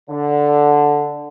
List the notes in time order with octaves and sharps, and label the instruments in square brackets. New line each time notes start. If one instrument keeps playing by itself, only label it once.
[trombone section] D3